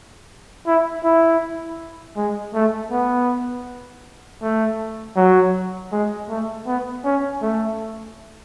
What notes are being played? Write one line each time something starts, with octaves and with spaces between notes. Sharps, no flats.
E4
E4
G#3
A3
B3
A3
F#3
G#3
A3
B3
C#4
A3